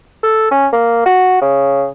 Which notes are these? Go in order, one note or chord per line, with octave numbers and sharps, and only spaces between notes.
A4
C#4
A#3
F#4
C#3